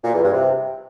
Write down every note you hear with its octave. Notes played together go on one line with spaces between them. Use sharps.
A#2
E2
G2
C3